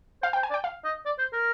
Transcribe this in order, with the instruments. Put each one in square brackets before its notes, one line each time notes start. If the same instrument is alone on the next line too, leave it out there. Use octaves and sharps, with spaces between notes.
[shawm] C5 [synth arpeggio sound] F5
[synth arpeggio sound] G5
[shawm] C5
[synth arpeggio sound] G#5
[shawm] D5
[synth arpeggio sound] G5
F5
[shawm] D#5
D5
C5
A#4